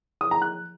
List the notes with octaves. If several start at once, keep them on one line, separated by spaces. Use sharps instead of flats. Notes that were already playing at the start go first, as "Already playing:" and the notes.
D#6
A#5
F#6